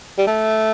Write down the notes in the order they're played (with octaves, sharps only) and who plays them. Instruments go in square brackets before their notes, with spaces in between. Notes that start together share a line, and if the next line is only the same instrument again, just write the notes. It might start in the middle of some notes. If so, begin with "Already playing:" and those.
[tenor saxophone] G3
A3